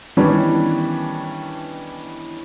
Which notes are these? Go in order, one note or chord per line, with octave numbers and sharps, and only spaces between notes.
D#3 E3 G3 B3 C#4 D4